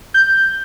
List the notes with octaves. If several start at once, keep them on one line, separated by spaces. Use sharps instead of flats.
G6